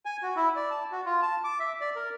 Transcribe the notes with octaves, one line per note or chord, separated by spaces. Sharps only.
G#5
F#4
E4
D5
A5
F#4
F4
A5
D6
E5
D5
A#4